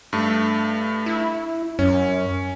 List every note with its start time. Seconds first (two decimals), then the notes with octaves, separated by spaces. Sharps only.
0.13 G2 A3
1.06 E4
1.79 F#2 C#4